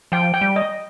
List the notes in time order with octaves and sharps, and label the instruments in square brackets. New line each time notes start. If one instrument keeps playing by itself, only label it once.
[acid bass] F3 [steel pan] G5
[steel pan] G5
[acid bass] G3
[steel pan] D#5